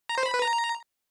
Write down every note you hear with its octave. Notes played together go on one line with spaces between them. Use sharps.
A#5
C5
B5
B4
A#5